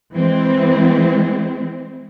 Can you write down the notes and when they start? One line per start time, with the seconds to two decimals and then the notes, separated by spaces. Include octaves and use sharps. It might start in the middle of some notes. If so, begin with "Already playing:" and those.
0.13 E3 G#3 C4